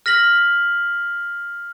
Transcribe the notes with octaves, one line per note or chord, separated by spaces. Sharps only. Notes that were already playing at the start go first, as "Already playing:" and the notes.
F6 A#6 B6 F#7